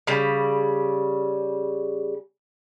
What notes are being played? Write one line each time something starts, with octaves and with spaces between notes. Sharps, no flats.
C#3 G3